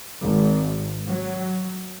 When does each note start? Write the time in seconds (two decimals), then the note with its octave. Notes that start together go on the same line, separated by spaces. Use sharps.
0.21 G#1
1.07 F#3